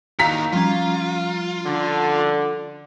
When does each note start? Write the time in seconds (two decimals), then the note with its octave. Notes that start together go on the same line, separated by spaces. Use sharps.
0.19 D#2 D#3 F#4 F5 A#5 E6 B6
0.53 F3 G3 C#4 F4
1.65 D3